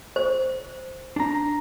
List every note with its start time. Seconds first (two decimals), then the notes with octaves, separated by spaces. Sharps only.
0.16 C5
1.16 D4 A#5